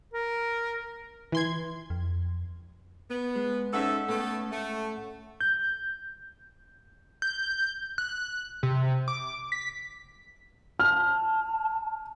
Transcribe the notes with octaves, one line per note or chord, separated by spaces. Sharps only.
A#4
E3 C6 G#6
F2
B3
G#3
G#2 C#4 A4 E5 F#5 E6
A2 A3 B3 A4
A3
G6
G6
F#6
C3
D6
B6
A5 F6